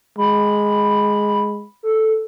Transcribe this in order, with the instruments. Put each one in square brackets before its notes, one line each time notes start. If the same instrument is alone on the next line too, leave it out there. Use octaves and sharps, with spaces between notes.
[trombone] G#3 [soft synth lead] B5
[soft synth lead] A4